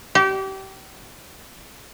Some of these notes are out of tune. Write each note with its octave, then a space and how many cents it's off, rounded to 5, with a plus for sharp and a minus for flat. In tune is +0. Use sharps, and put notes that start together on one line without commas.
G4 -30